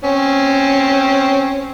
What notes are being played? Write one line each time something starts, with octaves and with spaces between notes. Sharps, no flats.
C4 C#4